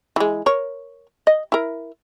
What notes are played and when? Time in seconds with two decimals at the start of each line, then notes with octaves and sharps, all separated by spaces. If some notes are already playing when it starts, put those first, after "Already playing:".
0.16 E3 G#3
0.46 A#4 C#5
1.27 D#5
1.52 E4 A#4